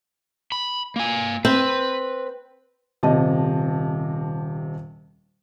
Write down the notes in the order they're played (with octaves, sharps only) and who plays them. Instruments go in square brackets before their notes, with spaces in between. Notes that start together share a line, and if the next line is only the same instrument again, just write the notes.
[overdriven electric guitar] B5
A#3 G#5
[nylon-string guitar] C4 [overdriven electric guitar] B4
[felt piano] D#1 C3 D#5 A5